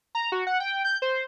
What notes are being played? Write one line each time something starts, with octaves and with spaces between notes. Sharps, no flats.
A#5
F#4
F#5
G5
G6
C5